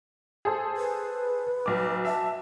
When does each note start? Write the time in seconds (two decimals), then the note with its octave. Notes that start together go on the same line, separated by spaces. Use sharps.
0.45 G#4 A4 C5
0.77 B4
1.66 B1 D6
2.05 E5 A5